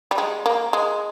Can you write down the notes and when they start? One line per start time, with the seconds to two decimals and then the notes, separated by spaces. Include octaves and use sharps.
0.11 G3
0.18 G#3
0.46 A#3
0.73 G#3